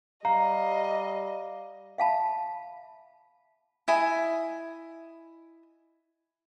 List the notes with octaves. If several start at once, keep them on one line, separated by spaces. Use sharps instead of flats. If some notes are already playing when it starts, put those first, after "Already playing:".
G3 D#5 F5 A#5
E5 F5 A5 B5
E4 D#5 G#5